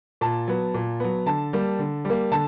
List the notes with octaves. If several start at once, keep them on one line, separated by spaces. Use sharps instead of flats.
A#2 A5
F#3 B3
A#2
F#3 B3
D3 A5
G3 A#3
D3
G3
A#3
D3 A5